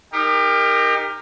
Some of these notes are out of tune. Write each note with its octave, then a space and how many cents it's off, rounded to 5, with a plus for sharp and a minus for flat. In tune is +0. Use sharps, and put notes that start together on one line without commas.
D#4 +0 G4 +30 A#4 +0